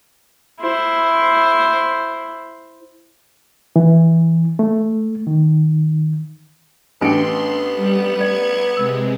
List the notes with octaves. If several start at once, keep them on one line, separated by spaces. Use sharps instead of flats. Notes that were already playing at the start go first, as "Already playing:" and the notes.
E4 C5
E3
A3
D#3
A1 B3 D4 G#4 G5 C6 D7
G3
D5 G#6
C3 G#3 E6